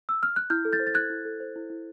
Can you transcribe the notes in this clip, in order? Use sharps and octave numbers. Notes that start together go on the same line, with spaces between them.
E6
F6
F#6
E4 F6 G6
A4
G6 A6
C5
A6
E4 F#6 G#6
E4
A4
C5
E4
E4